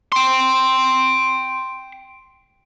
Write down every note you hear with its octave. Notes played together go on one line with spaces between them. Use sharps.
G5 C6